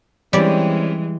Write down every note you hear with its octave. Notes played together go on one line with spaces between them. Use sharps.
E3 G3 G#3 C4 C#4 G4 D5